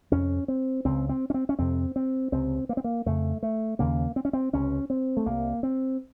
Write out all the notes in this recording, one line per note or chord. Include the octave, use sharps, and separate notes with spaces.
F2 C3 C#4
C4
C#2 C#3 C4
C4
C#4
C4
C#4
F2 C3 C4
C4
C#2 C3 C4
A#3
C4
A#3
F2 C#3 A3
A3
D#2 C#3 A#3
C4
C#4
C4
C#2 C3 C#4
C4
A3
C2 C3 A#3
C4